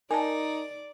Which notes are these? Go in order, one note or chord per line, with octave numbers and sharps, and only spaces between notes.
D#4 A#4 D5 G#5 A5